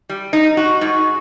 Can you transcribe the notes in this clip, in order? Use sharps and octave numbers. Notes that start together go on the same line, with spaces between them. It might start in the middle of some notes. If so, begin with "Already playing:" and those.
G3
D#4
F#4
G#2